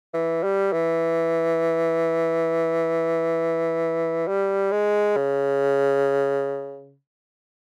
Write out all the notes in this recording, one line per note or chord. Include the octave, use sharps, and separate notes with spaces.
E3
G3
E3
G3
G#3
C#3